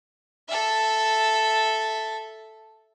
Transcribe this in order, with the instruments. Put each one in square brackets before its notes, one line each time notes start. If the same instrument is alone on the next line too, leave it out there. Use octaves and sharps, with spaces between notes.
[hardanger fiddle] A4 E5